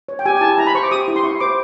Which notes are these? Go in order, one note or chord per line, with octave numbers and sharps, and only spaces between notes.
C#5
G5
G4 G#5
G#5
E4 A5
E4 A#5
B5
C5 C#6
D6
G4 D#6
E4
C6
E4 C#6
C5 D6